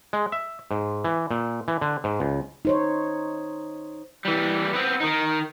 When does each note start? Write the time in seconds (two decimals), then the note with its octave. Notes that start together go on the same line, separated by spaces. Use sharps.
0.13 G#3
0.32 E5
0.71 G#2
1.04 E3
1.31 A#2
1.68 E3
1.81 D3
2.04 G#2
2.20 C#2
2.65 D#4 C5 C#5
4.25 E3 G3
4.73 B3 C4
5.00 D#3 D#4